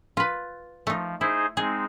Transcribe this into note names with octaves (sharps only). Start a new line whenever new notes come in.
F4 B4
F3 A3 D#4
D#4 E4 G#4 C5
G#3 C4 D#4 G#4